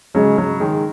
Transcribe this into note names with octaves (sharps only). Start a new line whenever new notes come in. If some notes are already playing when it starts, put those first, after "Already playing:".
C#3 F#3 G#3
C#3 F#3
D#3 G#3